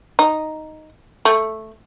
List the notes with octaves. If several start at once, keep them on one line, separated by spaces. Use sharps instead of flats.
D#4
A3